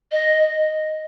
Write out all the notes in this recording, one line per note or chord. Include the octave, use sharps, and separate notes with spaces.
D#5